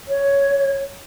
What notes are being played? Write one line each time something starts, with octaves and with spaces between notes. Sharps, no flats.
C#5